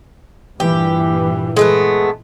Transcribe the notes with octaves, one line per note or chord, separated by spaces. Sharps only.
G2 A#2 E3 G4
G#3 A3 B3